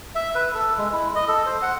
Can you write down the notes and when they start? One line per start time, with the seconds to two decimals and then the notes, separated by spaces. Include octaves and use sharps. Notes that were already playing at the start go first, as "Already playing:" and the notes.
0.15 E5
0.35 B4
0.54 A4
0.78 G#3
0.93 E4
1.15 D#5
1.28 A4
1.46 C5
1.62 F#5